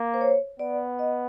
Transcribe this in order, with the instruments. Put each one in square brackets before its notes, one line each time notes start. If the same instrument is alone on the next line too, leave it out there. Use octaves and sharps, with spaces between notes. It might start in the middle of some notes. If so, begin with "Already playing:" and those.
Already playing: [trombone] A#3
[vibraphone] C5
C#5
[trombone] B3 [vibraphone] D5
[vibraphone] D#5